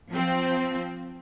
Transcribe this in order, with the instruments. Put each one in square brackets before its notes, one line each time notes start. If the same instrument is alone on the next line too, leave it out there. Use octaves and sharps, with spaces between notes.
[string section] F3 C4